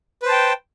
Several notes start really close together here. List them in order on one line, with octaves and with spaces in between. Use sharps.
B4 C5 A5 G5